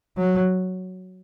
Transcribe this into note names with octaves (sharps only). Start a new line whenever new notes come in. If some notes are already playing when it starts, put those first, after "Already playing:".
F#3